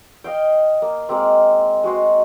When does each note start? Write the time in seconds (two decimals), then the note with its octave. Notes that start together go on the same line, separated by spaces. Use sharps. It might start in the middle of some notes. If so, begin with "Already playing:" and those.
0.24 D#5 F5 G5
0.82 A#3
1.09 G#3 A#3 C4
1.84 G#3 F#4 C5